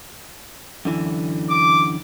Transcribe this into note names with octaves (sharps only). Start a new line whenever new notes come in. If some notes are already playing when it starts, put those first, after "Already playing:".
F#2 D3 E3
D6